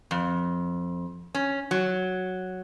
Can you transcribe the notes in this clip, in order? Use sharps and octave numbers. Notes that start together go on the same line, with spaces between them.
F2
C#4
F#3